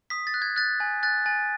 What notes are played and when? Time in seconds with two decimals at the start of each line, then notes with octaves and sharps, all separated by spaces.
0.10 D#6 B6
0.27 A6
0.34 F#6
0.42 G#6
0.56 F#6 A6
0.80 G#5
1.03 F#6 A6
1.26 G#5 A6